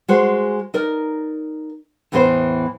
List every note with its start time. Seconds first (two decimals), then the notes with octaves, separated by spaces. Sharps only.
0.08 G#3 F#4 C5
0.74 D#4 A#4 D5
2.12 E2 A2 E3 B3 A#4 C5